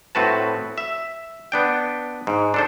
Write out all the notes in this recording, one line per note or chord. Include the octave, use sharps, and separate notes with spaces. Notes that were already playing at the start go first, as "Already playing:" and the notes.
A2 C4 F#4 B4 A5
E5
B3 D4 G5
G#2
D4 A4 C5